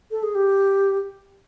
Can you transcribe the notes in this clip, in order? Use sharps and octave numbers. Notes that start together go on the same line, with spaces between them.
A4
G#4
G4